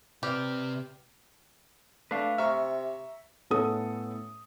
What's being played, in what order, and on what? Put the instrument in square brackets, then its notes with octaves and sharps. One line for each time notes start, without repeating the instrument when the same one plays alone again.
[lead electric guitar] C3 C4 [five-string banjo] G4 [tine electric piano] B4 D5 F6
[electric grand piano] A3 [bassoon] D4 [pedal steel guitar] B4 F5
[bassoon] C3 [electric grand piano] E5 A#5 C#6 [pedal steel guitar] F6
[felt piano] A2 B3 C#4 A4 D#6